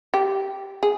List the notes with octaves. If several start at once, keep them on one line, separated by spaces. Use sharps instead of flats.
G4
G#4